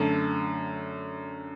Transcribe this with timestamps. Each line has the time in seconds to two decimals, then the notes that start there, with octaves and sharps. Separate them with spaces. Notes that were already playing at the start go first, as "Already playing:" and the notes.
Already playing: F#2 D3 A3 A5